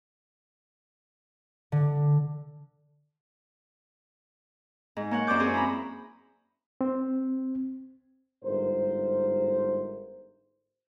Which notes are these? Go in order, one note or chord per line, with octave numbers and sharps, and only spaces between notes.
D3
G#2
A#3 C#5 F#5
F#2 C5 D5 D6 G6
C4 G#4 C5 C#5
E4 A#5 B5
C4
G1 G#2 A#4 C5